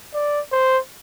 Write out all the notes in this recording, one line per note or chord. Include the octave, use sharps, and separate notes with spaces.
D5
C5